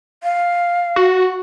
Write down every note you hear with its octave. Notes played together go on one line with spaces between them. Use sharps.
F5
F#4